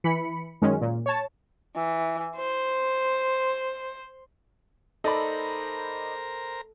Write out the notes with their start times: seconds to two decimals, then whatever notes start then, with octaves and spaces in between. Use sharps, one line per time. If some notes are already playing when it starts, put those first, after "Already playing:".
0.04 E3 B5 C#7
0.62 F#2 D#3 G#3 C#4
0.81 A#2
1.06 C#5 A5
1.75 E3
2.36 C5
5.04 D#4 A4 A#4 C5 D5 A#5 B5